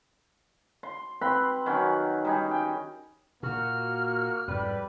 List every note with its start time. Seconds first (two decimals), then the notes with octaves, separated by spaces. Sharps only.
0.83 C6
1.21 C4 B4 B5 C6
1.66 D#3 F#3 C#4
2.25 G3 D#4 G#4
2.51 G5
3.43 A#2 A#3 F#4 F6
4.48 F2 G#2 G3 B4